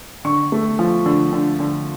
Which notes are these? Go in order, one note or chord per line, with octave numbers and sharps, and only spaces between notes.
D3 C#6
A3
F3
D3
D3
D3